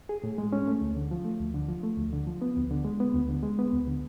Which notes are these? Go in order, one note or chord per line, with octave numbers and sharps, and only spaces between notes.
G#4
A2
G#3
C#4
A3
D2
D3
F3
A3
D2
D3
F3
A3
D2
D3
F3
B3
D2
D3
G#3
B3
D2
D3
G#3
B3
D2
D3